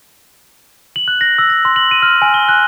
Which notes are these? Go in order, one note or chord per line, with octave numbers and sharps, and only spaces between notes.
F#7
F#6
A#6
E6
A#6
C6
F#7
D#7
F6
G#5
G7
F#6